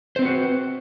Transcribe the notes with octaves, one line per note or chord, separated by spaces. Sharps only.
C4 F#4 B4 C5